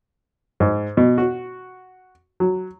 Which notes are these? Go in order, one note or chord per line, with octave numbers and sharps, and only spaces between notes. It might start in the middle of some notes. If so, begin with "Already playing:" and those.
G#2
B2
F#4
F#3